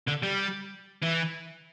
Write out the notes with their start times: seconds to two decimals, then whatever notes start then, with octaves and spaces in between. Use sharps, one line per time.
0.08 D3
0.23 G3
1.03 E3